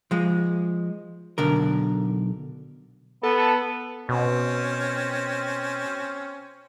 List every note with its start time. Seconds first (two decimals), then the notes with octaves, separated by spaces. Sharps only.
0.11 F3 G#3
1.38 B1 D3 A#4
3.23 B3 A4
4.09 B2 C4 C#4